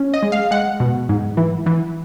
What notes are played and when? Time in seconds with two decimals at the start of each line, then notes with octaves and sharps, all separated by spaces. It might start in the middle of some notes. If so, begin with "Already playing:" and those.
Already playing: C#4
0.14 D#5
0.22 G#3
0.32 F5
0.51 G#3 F#5
0.80 B2
1.09 G#2
1.37 E3
1.66 E3